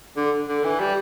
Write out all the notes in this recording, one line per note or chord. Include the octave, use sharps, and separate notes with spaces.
D3
D3
E3
G3